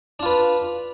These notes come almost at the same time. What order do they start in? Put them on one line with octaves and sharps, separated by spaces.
D4 F4 B4